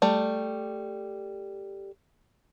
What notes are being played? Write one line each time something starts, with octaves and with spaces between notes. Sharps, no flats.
G3 A3